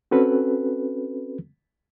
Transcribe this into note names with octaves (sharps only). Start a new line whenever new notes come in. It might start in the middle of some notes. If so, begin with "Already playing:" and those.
C4 C#4 F#4 A4 B4